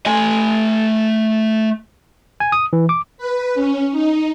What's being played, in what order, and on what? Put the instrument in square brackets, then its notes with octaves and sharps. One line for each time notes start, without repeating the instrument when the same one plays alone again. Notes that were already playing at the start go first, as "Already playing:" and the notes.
[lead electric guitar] A3 G#5
[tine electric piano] G#5
D#6
E3
D6
[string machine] B4
C#4
D#4